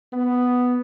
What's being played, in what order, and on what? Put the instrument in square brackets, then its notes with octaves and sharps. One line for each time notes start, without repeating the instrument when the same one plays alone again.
[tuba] B3